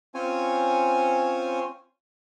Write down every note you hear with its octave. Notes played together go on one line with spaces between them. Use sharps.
C4 C#4 F4 C5 C#5 G#5